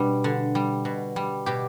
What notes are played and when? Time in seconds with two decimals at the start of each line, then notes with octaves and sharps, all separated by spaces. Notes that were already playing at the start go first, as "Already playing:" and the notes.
Already playing: B2 G3 D4
0.24 D3
0.55 G3
0.85 B2
1.16 G3
1.46 B2 G4